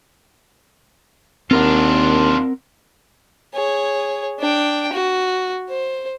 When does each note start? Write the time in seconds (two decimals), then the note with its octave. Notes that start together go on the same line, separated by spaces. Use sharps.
1.51 D#2 C4 D4 F4 A#4 F#5
3.54 G#4 C#5
4.40 D4 G5
4.93 F#4
5.70 C5